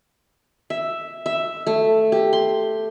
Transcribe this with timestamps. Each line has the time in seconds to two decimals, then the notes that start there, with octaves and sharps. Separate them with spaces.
0.70 E5
1.26 E5
1.67 A3
2.12 G4
2.33 C6